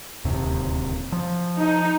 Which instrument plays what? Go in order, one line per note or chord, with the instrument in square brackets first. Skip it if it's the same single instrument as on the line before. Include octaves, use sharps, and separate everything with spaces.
[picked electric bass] D1 D#2 C3
F3
[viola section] D#4